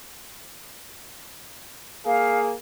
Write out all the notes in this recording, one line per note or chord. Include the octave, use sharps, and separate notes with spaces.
A#3 G#4 F5